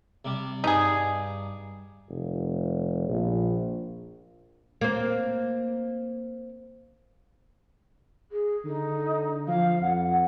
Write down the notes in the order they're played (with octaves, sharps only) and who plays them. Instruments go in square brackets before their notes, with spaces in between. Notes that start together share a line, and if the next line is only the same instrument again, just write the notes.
[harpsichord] C3 G3
[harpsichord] G2 [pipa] D#4 G#4
[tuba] F1
A#1
[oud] A#3 C4
[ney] G#4
[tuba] D3 [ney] D#4
[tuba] F3 [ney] F5
[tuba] F2 [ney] F#5